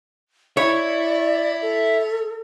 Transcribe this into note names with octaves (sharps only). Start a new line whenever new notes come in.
C#5 D5 E5 B5
A4